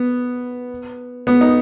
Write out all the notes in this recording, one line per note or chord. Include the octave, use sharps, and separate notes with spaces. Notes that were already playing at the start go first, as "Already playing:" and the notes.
Already playing: B3
B3
D#4